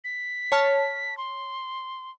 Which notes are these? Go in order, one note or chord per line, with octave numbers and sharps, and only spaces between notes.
B6
C#5 A5 F6
C6